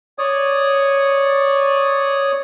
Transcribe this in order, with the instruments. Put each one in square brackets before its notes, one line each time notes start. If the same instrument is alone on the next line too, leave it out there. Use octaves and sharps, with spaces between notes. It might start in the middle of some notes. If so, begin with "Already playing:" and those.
[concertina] C#5 D5 D#6